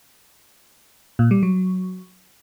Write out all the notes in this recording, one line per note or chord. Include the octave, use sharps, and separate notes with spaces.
A#2
G3
F#3